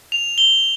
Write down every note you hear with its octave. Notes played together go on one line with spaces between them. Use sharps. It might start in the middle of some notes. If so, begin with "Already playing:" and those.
F7
G7